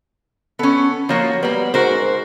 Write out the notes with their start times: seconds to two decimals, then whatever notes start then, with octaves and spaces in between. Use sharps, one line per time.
0.59 B3 C#4 A4
1.09 F3 F#3 A#3 F#4
1.43 G3 A#3 B3
1.74 G#2 F#4 A#4 C5